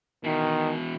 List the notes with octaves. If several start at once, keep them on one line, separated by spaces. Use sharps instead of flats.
B2 D#3 E3